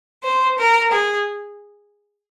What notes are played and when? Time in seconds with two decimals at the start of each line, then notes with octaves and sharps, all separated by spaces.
0.24 C5
0.58 A#4
0.92 G#4